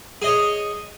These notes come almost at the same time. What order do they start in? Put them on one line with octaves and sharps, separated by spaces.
G#4 D#5 C#5